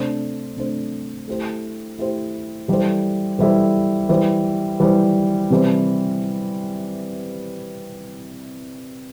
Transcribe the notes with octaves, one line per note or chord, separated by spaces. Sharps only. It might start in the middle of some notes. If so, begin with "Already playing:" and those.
Already playing: C3 A3 D4 C5
C3 A3 D4 C5
A3 E4 G4 C5
A3 E4 G4 C5
E3 G3 E4 A4 C5
E3 G3 E4 A4 C5
E3 G3 E4 C5
E3 G3 E4 C5
C3 E3 G3 E4 C5